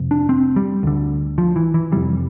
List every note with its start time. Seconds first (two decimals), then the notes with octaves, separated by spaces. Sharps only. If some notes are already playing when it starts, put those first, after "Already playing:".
Already playing: F2 C3
0.11 D4
0.29 C4
0.56 G3
0.83 D2 D3
1.38 F3
1.56 E3
1.74 E3
1.92 F2 C3 G3